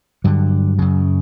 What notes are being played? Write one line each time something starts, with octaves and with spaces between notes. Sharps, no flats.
G2 D3 F#3
F#2 C#3